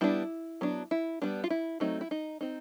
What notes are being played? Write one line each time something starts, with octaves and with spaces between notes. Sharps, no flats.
G3 B3 D4 E4
F#3 B3 D4
E4
G3 B3 D4
F4
E4
F#3 A3 C4 D#4
E4
D#4
C4 D#4